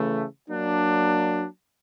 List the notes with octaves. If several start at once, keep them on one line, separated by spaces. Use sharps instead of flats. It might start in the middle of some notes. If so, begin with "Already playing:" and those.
Already playing: C#3 E3 A3
F#3 A#3 D4